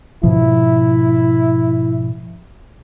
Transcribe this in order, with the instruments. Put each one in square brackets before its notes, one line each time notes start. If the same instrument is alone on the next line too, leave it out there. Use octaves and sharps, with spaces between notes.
[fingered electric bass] G#2 B2 F3 [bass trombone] E4